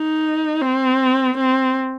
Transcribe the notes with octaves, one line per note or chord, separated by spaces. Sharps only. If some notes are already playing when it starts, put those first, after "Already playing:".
Already playing: D#4
C4
C4